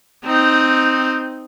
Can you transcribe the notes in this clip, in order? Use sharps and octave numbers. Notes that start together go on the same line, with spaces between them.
C4 D#4